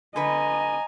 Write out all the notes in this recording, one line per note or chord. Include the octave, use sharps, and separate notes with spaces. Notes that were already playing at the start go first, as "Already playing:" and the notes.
D3 B4 D#5 G#5 A#5